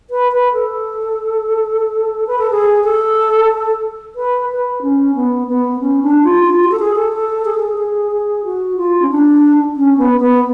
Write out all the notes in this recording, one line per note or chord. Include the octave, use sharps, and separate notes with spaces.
B4
B4
A4
B4
A4
G#4
A4
B4
B4
C#4
B3
B3
C#4
D4
F4
D4
F4
F#4
A4
G#4
A4
A4
G#4
A4
G#4
G#4
G#4
F#4
F4
C#4
D4
C#4
B3
B3